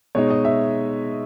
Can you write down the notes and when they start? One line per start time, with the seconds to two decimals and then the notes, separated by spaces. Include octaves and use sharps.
0.15 B2 G#3 D#4 C#5
0.30 D#5
0.45 E5